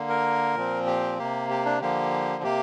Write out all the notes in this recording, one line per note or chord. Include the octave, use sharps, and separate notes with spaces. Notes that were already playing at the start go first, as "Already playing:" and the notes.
Already playing: D3 A#3
A#4
A#2 F3 C4
G4
C3 A#3 G4
G4
D4
D3 F3 A#3 G4
C3 A#3 G4